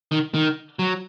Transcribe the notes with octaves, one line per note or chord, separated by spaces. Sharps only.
D#3
D#3
F#3